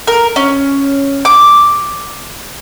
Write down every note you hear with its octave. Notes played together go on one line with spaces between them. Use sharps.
A#4
C#4
D6